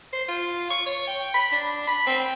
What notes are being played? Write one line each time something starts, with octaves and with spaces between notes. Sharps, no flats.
C5
F4
C#6
C#5
G5
B5
D4
B5
C4